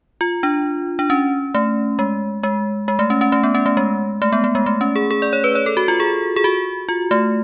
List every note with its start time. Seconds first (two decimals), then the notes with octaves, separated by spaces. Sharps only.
0.21 F4
0.43 D4
0.99 D4
1.10 C#4
1.55 A3
1.99 G#3
2.43 G#3
2.88 G#3
2.99 A3
3.10 C#4
3.21 C#4
3.32 A3
3.43 B3
3.55 C#4
3.66 A3
3.77 G#3
4.22 A3
4.32 B3
4.44 A3
4.55 G#3
4.66 A3
4.81 C#4
4.96 G#4
5.11 G#4
5.22 D5
5.33 C#5
5.44 B4
5.55 C#5
5.66 A4
5.77 F#4
5.88 F4
6.00 G#4
6.36 G#4
6.44 F#4
6.89 F4
7.11 A3